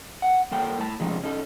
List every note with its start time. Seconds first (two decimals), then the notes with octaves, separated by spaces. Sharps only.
0.22 F#5
0.51 G3 A#3 A4 G5
0.78 A2 A5
1.00 C3 F3 G#3 C#4 D#4
1.23 C#4 D#4 A4